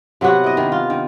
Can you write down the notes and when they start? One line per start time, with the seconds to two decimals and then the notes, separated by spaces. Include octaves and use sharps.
0.21 C3 F#3 B3 F#4
0.44 E4 D#5
0.57 D#3
0.72 F4
0.90 D#3